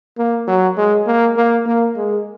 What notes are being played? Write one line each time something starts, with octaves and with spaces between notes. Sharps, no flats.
A#3
F#3
G#3
A#3
A#3
A#3
G#3